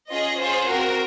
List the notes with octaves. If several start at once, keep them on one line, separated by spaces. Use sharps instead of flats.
C#4 F4 G#4 D#5
C#4 F4 G#4 C5
C4 F#4 A#4